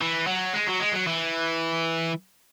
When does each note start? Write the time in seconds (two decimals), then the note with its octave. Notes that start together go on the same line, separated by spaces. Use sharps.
0.01 E3
0.27 F#3
0.53 G#3
0.67 F#3
0.80 G#3
0.93 F#3
1.07 E3